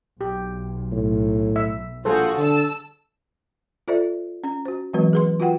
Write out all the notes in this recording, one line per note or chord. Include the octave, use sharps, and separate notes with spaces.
B1 G4
A2
E5
A#1 G3 F4 F#4 G#4 A4 C5
D3 A5 E6
F4 A4 C5 D5 E5
C#4 A#5
F#4 C5
E3 F#3 G#3 C4 F#4 B4
G#4 B4 C6
F4 F#4 B4 F#5 G5